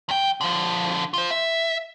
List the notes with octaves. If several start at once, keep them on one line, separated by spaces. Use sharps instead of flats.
E2 G5
D3 F3
F4 C5
E5